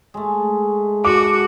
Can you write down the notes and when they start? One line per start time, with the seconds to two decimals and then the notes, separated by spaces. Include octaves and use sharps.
0.14 G#3 A3
1.05 F#4 D6